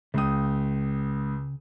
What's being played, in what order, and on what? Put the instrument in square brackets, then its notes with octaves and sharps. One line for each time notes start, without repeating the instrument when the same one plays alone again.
[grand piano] C#2 D#6 [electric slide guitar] C#3 G5